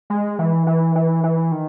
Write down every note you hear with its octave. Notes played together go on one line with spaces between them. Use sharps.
G#3
E3
E3
E3
E3
D#3